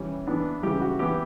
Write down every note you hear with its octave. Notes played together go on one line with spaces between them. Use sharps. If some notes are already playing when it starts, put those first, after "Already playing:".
Already playing: E3 G3 C#4
E3 B3 D4
C#3 E3 G3 G4
F#4
E3 B3 E4 G4